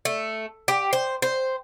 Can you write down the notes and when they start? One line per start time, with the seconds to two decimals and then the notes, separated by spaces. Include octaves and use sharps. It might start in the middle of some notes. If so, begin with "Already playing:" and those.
0.05 A3
0.68 G4
0.93 C5
1.22 C5